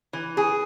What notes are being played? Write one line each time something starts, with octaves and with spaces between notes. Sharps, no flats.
E3
G#4